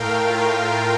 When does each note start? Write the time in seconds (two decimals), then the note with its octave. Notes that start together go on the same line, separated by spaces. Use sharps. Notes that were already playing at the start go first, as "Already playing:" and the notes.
Already playing: A2 A3 A#4 F5 G5
0.30 F4